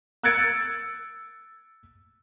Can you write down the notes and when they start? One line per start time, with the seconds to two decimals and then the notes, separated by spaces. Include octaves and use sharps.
0.23 E6 F#6 G#6 A6 C#7 D7